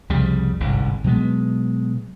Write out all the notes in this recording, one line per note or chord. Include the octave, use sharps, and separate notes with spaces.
C2 F2 C#3 G3
G1 C2 G#2
B2 F#3 G#3 B3